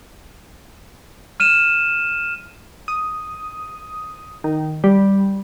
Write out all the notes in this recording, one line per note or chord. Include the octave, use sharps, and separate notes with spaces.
F6 D#7 E7
D#6
D#3
G3